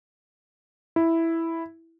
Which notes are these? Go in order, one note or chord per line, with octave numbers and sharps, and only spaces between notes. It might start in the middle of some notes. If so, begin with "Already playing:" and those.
E4